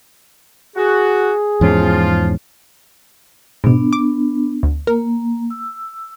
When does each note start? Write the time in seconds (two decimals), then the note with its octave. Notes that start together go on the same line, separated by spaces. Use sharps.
0.76 F#4 G#4
1.61 E2 G#2 F3 C#4 F4
3.64 G#2 B2 B3 D4
3.93 D6
4.63 D2
4.87 A#3 A#4
5.50 E6